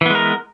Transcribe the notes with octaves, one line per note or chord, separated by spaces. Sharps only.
E3 G#3 B3 A#4